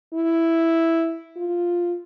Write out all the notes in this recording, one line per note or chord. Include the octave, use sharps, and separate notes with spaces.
E4
F4